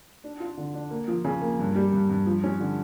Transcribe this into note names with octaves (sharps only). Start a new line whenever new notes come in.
D4
F4
D3
D4
A#3
F3
C#3
A#3
G2
G3
G2
G2
F3
C#4
D3